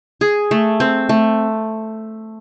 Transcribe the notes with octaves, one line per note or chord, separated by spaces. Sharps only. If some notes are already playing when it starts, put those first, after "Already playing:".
G#4
A3
C4
A3